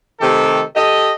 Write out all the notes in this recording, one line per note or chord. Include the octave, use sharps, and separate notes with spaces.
C3 D#3 A3 G4 A4
G4 A4 D#5